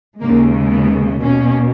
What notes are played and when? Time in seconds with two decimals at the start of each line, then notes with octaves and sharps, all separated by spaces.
0.20 D#2 C#3 G#3 A#3
0.71 B3
1.22 B2 A#3 C#4